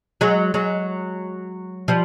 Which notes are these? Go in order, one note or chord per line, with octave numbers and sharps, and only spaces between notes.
F#3 G#3
F#3 G#3
F3 G3